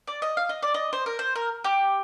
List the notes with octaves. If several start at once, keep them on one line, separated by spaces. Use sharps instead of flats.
D5
D#5
F5
D#5
D5
D#5
C5
A#4
C5
A#4
G4